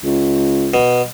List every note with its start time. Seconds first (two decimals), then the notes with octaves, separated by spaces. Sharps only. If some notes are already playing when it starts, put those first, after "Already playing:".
0.04 C#2
0.74 B2